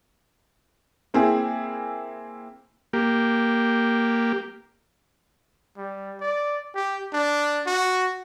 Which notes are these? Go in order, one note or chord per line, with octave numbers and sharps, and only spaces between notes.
A#3 C4 E4 G#4
A#3 G4
G3
D5
G4
D4
F#4